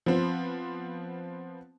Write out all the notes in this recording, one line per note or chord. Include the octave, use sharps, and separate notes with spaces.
F3 B3 C4